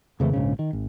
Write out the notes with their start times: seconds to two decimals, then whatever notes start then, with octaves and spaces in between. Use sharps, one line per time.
0.20 F2 C#3 E3 A3
0.33 A#1 G#2 C#3
0.59 D#3
0.73 G#1